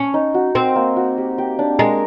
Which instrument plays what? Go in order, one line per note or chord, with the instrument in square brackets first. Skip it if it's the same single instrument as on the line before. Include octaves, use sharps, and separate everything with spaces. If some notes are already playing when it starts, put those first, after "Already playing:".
Already playing: [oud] C#4
[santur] D#4
F#4
[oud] C4 [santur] A#4
[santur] A#3
F#4
G4
G4
D4
[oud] G#3 [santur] A#4